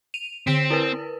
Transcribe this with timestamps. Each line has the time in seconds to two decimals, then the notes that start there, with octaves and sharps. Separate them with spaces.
0.14 D#7 F7
0.47 D3 C4 B6 D7
0.70 E4 A#4 B4